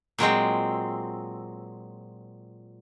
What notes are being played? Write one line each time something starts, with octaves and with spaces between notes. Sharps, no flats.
A#2 F#3 G#3 C4